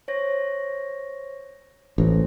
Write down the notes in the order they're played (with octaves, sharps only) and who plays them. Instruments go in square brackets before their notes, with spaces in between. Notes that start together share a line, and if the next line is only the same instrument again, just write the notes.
[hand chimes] C5 C#5 A#6
[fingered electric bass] A1 [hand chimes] C#4 E4 C5